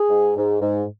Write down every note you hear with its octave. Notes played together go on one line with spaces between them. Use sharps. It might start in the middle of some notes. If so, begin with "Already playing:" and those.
Already playing: G#4
G#2
G#2
G#2